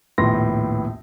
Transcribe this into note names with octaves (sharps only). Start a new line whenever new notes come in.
A#1 D#2 A2 B3 C6 A#6